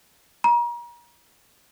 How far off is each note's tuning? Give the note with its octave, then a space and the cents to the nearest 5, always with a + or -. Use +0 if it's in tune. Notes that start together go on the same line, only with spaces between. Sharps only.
A#5 +35